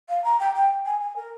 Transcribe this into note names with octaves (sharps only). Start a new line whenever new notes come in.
F5
A#5
G5
G5
G#5
G#5
A#4